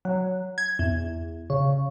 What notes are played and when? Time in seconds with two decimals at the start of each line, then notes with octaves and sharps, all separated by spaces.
0.05 F#3
0.58 G#6
0.79 E2
1.50 C#3